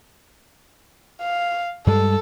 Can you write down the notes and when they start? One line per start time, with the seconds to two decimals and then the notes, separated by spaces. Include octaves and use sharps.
1.21 F5
1.87 G2 G3 G#3 A4